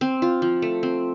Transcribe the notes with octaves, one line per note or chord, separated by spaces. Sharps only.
C4
F4
F3
A3
C4